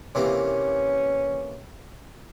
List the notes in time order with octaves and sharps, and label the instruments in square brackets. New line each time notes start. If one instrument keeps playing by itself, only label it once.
[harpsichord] C3 E3 A#3 [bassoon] C#4